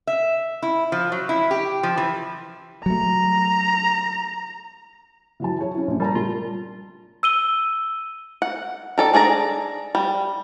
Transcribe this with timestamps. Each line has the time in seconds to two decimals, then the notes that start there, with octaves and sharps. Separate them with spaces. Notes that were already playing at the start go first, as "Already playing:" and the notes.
0.07 E5
0.62 E4
0.92 F3
1.12 F#3
1.29 E4
1.51 G4
1.83 F3
1.97 E3
2.86 F#3 A3 A#5
5.40 E3 F#3 A5
5.58 E4 C#5
5.74 C#4 E4
5.88 A#1
6.00 G3 A#4 A5 A#5
6.15 G3 F4 A#4
7.23 E6 D#7 G7
8.42 F#5
8.98 D#3 A4 D5
9.13 D4 G#4 D5 A#5
9.95 G3